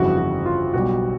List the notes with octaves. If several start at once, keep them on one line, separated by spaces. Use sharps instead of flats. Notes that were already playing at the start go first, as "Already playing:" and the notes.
Already playing: G1 F2 C#3 E3 G3 F#4
F#4
F4
B1 B2 G3 F#4